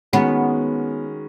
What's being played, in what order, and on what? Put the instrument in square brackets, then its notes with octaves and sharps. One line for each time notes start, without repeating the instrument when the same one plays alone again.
[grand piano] D#3 G#3 C#4 F#4 [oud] B3